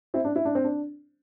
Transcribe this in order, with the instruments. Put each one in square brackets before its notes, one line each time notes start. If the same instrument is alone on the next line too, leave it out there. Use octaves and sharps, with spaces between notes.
[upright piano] C4 E4
D4
E4
D4
C4
D4